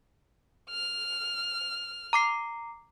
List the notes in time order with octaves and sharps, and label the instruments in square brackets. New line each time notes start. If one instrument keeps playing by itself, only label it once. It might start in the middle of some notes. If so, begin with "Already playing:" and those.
[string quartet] F6
[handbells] A#5 D6 C7